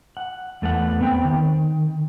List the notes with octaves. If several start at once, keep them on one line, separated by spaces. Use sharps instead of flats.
F#5
E2 A3 B3 F#5
B3 C4 G5
D#3